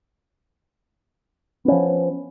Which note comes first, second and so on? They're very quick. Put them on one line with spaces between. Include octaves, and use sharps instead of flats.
B3 C#4 F3